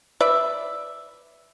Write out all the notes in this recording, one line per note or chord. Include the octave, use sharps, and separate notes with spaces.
B4 D5 E5